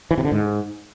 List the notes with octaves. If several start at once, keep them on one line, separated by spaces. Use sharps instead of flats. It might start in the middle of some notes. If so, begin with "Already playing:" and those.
E3
C3
D3
G#2